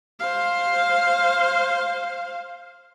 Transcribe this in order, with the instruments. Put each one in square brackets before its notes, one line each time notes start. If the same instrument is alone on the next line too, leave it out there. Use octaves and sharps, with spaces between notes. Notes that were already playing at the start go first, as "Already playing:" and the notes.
[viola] C5 F5